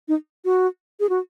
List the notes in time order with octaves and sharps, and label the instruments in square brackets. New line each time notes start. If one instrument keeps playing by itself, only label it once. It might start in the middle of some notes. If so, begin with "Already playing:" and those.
[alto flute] D#4
F#4
G#4
F#4